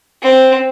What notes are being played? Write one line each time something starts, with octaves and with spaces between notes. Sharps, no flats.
C4